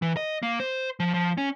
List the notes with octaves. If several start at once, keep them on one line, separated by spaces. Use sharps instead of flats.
E3
D#5
A#3
C5
F3
F3
C#4